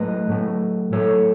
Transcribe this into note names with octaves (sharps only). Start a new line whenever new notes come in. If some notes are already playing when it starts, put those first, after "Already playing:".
Already playing: A2 F#3 A3 B4 D#5
A2 F#3 A3
A2 F#3 A3 A4 C#5